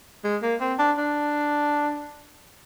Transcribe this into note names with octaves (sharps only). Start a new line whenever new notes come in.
G#3
A#3
C4
D4
D4